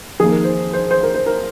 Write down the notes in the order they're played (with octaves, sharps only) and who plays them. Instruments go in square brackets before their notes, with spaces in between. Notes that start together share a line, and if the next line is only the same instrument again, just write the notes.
[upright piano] F2 D#3 A#3 G#4
A#4
C5
C5
C5
A#4
C5
A#4